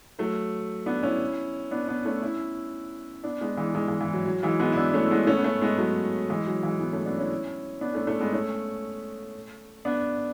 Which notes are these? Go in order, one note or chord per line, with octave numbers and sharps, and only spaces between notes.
F#3 A3
B3 D4
C#4 E4
B3 D4
B3 D4
A3 C#4
C#4 E4
B3 D4
G#3 B3
E3 G#3
E3 G#3
E3 G#3
E3
F#3
F#3
E3 G#3
G#3 B3
E4
B3 D4
A3 C#4
G#3 B3
A3 C#4
B3
A3 C#4
G#3 B3
F#3 A3
E3 G#3
F#3
E3 G#3
G#3 B3
A3 C#4
B3 D4
C#4 E4
B3 D4
A3 C#4
A3 C#4
G#3 B3
A3 C#4
B3 D4